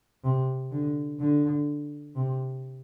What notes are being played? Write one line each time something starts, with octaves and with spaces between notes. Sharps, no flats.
C3
D3
D3
C3